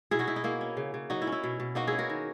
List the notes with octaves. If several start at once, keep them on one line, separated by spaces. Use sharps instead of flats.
B2 E4 G#4
D#4 F#4
B2 E4
D#4
A#3 E4
C#4
C#3
C#3
F#3 D#4 F#4
E4
C#4
E4
B2
B2
A#3 D#4 F#4
C#4 E4 G#4
F#4 A#4
D#3